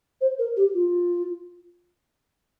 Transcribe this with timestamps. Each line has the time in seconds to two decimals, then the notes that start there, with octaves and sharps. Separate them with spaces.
0.21 C5
0.39 A#4
0.57 G4
0.74 F4